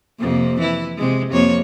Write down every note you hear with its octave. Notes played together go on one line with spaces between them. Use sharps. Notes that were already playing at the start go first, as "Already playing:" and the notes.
F2 C3 A#3
E3 E4
C3 G#3
F2 A#3 C#5